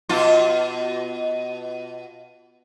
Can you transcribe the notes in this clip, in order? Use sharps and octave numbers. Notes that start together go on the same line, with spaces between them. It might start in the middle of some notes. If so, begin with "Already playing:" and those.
B2 F4